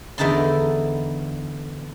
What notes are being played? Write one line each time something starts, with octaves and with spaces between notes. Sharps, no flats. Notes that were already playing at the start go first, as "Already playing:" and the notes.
E2 D3 E3 D#4 A5 C6